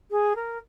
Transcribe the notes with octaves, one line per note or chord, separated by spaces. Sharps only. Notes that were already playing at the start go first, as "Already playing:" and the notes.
G#4
A#4